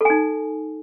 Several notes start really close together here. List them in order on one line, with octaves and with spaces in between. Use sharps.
A4 G#5 D#4